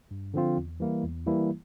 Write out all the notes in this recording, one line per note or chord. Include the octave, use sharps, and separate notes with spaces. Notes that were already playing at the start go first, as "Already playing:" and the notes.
G2
D3 F3 C4 F4
E2
E3 G3 A#3 E4
E2
E3 G3 A#3 E4